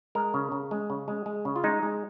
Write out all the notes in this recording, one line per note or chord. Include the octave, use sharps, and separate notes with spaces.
G#3 A#4
C#3
C#3
G#3
C#3
G#3
G#3
C#3
F4
G#3 D#4
G#3